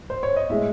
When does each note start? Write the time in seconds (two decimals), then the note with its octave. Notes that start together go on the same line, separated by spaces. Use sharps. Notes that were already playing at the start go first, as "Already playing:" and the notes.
0.10 C5
0.23 C#5
0.36 D#5
0.50 A2 G#3 E5